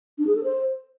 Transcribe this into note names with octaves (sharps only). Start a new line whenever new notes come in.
D4
G#4
A4
C5